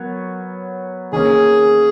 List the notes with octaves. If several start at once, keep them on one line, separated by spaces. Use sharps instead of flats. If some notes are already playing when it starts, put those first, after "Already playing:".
Already playing: F#3 B3 A#4 C#5
D#3 A#3 C#4 G#4